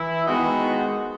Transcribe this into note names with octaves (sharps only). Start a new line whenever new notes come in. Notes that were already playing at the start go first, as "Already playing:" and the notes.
Already playing: E3 E4
D#3 G#3 B3 D#4 F#4